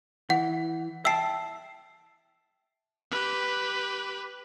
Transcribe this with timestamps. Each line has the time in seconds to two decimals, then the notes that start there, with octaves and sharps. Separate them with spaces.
0.30 E3 F#5
1.05 E5 G5 A5 E6 C7
3.11 G4 B4